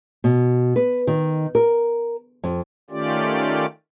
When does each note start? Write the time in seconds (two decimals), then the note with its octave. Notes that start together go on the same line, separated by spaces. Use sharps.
0.24 B2
0.76 B4
1.07 D#3
1.55 A#4
2.44 F2
2.90 D#3 A3 C#4 F4 G4 D5